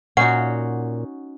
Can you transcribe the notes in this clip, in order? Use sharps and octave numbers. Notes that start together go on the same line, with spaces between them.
A#2 C#4 D#4 F#4 F#5